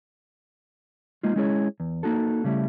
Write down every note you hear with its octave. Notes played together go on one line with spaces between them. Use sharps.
G#3 A#3 D#4 F4
G#3 C#4 E4 G#4 C#5
E2
A#3 D#4 F#4 A4
C#3 G3 A3 E4